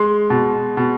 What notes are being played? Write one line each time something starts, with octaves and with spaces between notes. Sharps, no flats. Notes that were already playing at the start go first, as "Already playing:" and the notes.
Already playing: G#3 C6
B2
B2